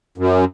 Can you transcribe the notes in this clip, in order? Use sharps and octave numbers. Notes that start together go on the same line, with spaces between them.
F#2